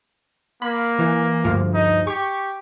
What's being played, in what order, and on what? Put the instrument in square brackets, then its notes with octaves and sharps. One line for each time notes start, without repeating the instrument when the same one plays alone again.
[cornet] A#3 [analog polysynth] B5
[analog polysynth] E3
D2 G2 F3
[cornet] D#4
[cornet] G4 [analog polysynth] C#6